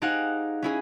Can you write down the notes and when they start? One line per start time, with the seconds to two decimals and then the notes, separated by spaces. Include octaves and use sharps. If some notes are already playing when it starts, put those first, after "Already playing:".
0.02 C4 D#4 G4 G#4 F5 F#5
0.63 C#4 E4 G#4